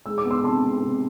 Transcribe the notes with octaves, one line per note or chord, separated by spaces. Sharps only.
G#3 E6
D6
B3
C6 E6
C3 A5 C6
G#3
C3